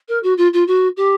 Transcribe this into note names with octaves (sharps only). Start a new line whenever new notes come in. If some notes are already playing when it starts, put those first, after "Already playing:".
A#4
F#4
F4
F4
F#4
G4